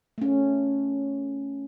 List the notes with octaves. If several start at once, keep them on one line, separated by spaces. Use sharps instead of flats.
A3 C#4